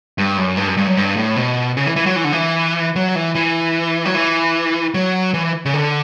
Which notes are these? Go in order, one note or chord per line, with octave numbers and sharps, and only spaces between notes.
G2
F#2
G2
F#2
G2
F#2
G2
A2
B2
C#3
E3
E3
F#3
E3
D3
E3
F#3
E3
E3
F#3
E3
F#3
E3
C#3
D3